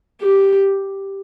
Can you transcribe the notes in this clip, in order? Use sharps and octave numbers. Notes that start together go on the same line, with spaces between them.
G4